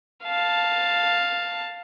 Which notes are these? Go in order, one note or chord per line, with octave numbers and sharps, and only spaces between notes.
F5 A5